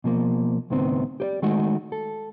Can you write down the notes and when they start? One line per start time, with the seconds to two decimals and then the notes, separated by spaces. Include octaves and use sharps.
0.04 B2 F3 A#3
0.70 C#2 A2 D#3 B3 C4
1.20 G4 C5 D5
1.42 D#3 G#3 A3 D#4 F#4
1.92 A4